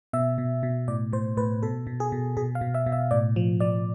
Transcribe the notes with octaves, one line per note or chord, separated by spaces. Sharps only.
B2 E5
B2
B2
A2 D5
A2 C5
A2 B4
B2 A4
B2
G#4
B2
B2 G#4
F5
B2
E5
B2
E5
A2 D5
F3
F3 D5